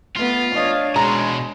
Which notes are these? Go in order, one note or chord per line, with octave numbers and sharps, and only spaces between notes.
A3 B3 F4
D4 C#5 D#5 F5
B2 G#3 G#4 A#5